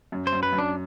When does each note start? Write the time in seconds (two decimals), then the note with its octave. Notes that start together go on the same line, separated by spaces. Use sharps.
0.12 F#2
0.27 C5
0.33 F#2
0.43 B4
0.53 F#2
0.58 D4